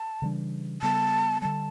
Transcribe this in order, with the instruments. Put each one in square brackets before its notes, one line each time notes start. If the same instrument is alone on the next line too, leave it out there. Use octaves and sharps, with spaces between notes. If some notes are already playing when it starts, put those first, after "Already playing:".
Already playing: [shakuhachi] A5
[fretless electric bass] C#3 E3 G3 D4
[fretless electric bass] C#3 G3 B3 [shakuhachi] A5
[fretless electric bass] D3 G3 [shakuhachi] A5